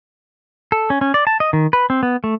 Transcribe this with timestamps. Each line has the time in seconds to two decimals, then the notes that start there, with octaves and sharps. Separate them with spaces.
0.72 A4
0.90 C#4
1.01 C#4
1.14 D5
1.27 A5
1.40 D#5
1.53 D#3
1.73 B4
1.90 C4
2.03 B3
2.24 A3